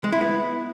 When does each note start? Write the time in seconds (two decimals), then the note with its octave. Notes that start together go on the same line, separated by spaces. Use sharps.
0.04 G#3
0.12 E4
0.21 B3